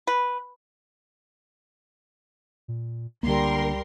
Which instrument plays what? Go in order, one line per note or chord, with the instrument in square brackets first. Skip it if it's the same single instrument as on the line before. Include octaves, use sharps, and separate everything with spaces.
[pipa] B4
[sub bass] A#2
[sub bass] C#2 [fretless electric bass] D3 A#3 [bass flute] G3 [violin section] A#4 C6